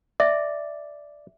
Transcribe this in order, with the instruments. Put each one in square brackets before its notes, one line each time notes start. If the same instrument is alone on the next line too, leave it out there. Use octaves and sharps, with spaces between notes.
[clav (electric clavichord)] D5 [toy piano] E5